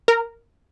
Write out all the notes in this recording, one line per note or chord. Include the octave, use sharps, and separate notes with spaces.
A#4